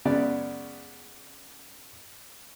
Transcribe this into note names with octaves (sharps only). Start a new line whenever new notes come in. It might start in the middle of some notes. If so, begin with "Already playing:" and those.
F#2 C#3 G#3 B3 D5